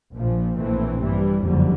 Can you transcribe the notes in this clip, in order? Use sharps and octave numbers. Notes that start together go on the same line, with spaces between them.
A#1 A#2 F3
A#1 A2 E3 A3 C4
G2 E3 G3
F#1 F2 D3 G3